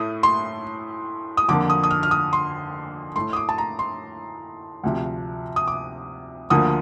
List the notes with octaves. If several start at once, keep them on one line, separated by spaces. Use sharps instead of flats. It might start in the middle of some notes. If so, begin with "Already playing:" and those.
Already playing: A2 A3 D#6
C6
D#6
F2 D3 F3 A#3 D6
D#6
D#6
F6
F6
D#6
C6
A2 A3 C6
D#6
D6
A5
A#5
C6
D2 C3 F3
D#6
D6
D2 D3 F3 A#3 D#6